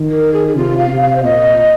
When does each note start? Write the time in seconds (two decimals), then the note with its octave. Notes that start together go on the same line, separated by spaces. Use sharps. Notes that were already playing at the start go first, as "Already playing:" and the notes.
Already playing: D#3
0.10 A#4
0.33 G#4
0.48 G#4
0.56 C3 F4
0.78 F5
0.90 C3
1.02 F5
1.16 C5
1.24 A#2 D#5